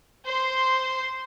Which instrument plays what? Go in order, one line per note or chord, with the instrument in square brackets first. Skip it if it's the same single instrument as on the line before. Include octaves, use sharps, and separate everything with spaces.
[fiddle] C5 C6